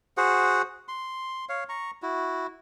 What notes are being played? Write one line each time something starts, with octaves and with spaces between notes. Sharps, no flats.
F#4 G#4 C5 F#5
C6
C#5 F5
A#5 C#6
E4 F#4